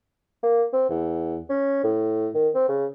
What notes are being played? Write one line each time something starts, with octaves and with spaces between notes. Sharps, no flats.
A#3
C4
E2
C#4
A2
D#3
C4
C#3